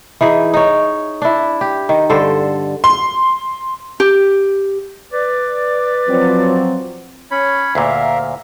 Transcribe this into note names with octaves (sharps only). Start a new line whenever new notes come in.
E3 D#4 G#4
D#4 C#5
D4 E4
G4
D#3
G2 D3 A4 C5
C6
G4
B4 D5
F3 F#3 C4
C#4 C#5 B5
D2 A#2 A#4 E5 F5